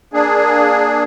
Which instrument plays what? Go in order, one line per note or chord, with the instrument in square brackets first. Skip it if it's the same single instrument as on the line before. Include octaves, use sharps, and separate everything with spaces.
[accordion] A#3 D4 G#4